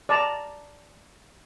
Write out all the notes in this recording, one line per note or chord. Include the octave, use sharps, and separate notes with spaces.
D5 A5 A#5